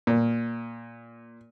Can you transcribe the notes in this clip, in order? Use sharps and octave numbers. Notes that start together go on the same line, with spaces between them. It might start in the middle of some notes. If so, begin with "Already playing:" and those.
A#2